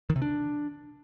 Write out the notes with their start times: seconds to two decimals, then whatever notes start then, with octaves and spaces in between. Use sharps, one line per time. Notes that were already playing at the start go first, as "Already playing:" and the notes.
0.10 D#3
0.16 C3
0.22 D4